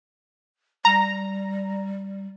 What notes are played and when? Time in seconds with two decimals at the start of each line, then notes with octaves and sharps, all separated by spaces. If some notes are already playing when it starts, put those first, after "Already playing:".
0.85 G3 A#5